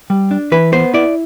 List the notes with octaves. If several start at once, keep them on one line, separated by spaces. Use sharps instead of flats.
G3
D4
E3 B4
B3 C5
E4 D5